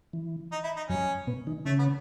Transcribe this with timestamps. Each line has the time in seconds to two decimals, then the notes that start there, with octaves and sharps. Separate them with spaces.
0.13 E3
0.52 D#4
0.64 E4
0.76 D#4
0.89 F#2 F#3 C#4
1.27 B2 B3
1.47 D#3 D#4
1.65 C#3 A3 C#4
1.79 B3